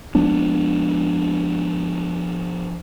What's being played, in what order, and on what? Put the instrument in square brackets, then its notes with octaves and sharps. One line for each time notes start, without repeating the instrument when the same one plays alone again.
[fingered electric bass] F3 G#3 B3 D4